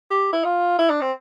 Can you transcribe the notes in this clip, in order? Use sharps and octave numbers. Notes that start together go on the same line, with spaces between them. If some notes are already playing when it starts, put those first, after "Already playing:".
G4
E4
F4
E4
D4
C4